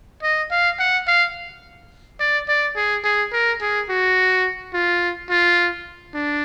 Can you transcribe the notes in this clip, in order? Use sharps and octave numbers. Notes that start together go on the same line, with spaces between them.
D#5
F5
F#5
F5
D5
D5
G#4
G#4
A#4
G#4
F#4
F4
F4
D4